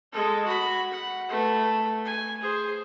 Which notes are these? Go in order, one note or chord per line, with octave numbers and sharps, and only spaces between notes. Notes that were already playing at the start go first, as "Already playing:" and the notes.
G#3 A4
F#4 B5
F#5
A3 B4
G#5
G#4 C5